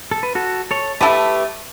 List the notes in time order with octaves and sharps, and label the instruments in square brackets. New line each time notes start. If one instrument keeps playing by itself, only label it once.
[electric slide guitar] A4
B4
F#4 A4
A4 C#5
[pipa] A3 E4 A4 [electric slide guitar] G4 B4